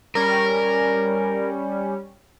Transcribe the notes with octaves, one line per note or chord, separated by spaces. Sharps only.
G3 C#4 A#4